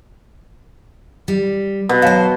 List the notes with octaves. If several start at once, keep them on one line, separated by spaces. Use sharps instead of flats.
G3
B2
F#3 C5 F5 A5